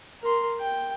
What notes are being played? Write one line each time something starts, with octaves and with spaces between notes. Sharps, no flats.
A#4 C6
G5